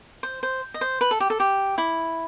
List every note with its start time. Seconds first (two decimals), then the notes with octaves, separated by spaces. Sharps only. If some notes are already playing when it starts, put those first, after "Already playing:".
0.23 C5
0.43 C5
0.74 D#5
0.81 C5
1.01 B4
1.11 A4
1.20 G4
1.30 A4
1.40 G4
1.78 E4